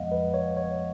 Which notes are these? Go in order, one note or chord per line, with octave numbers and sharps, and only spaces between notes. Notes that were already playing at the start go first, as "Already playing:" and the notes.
Already playing: F2 F3 G#3 B3 D#5 F5 F#5
B4
C#5
C#5